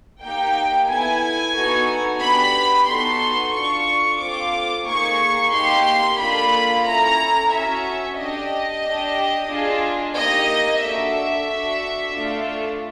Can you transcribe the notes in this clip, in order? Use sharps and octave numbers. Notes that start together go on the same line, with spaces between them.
A#3 D#4 G4 G5
B3 E4 A4 G#5
B3 D#4 F#4 A4
B3 D4 G4 B5
B3 D#4 F#4 A4 C6
D4 F4 A4 C#6
C4 F4 A4 D6
A#3 D#4 G#4 C#6
A#3 D#4 G4 C6
A#3 D4 F4 A4 B5
C#4 E4 A4 A#5
C#4 F#4 A4 E5
D4 G4 D#5
D4 G4
D4 F4 G#4
A#3 D#4 G4 D#5
D4 F#4 A4 E5
D4 F#4 A4
A3 D4 F4 A4